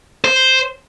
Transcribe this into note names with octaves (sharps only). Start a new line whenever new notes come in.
C5